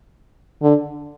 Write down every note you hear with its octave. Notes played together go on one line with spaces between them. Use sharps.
D3